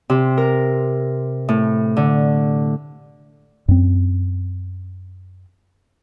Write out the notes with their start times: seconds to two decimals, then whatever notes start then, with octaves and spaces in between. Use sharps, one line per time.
0.10 C3
0.38 A#4
1.49 A2
1.97 D3
3.68 F#2 C4